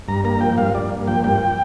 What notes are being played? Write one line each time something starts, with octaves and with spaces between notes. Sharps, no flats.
G2 A#5
A#3 A#5
F3 G5
G2 F5
G2 D5
A#3
F3 G5
G2 G5